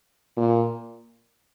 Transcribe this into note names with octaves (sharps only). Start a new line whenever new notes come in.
A#2